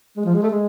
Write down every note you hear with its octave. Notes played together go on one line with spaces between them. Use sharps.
G#3
F3
G#3
A3
G#3